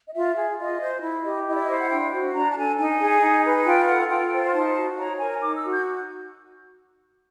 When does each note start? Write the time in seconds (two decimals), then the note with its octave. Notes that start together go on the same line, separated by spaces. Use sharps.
0.07 D#5
0.14 F4 E5
0.36 G#4
0.58 F4 D#5
0.80 C5
1.01 E4
1.23 G4 D#5
1.46 E4 D#5
1.53 D5
1.62 D#5
1.68 C5
1.79 F#5
1.89 D4 G5
2.12 F#4
2.34 D4 A#5
2.48 A5
2.56 A4 G#5
2.78 D#4 G#5
3.00 G#4
3.22 D#4
3.44 B4
3.66 F4 G5
3.88 A4 F#5
4.09 F4 G5
4.32 C5
4.53 D#4 A5
4.76 F#4
4.97 C#5 A#5
5.19 A#4 G#5
5.41 D#4 D6
5.56 E6
5.63 F#4
5.71 G6